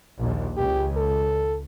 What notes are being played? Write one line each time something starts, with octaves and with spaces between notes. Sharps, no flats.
A#1 D#2
C#2 G4
A4